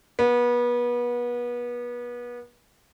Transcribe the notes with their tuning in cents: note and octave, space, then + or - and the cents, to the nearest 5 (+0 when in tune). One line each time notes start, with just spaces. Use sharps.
B3 -30